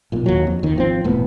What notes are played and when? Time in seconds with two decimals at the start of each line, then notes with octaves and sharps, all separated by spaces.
0.12 B1 A#2
0.26 D#2 F#3
0.47 F2
0.63 D#2 D#3
0.76 G#1 F3 C4
1.04 E1 A2 B3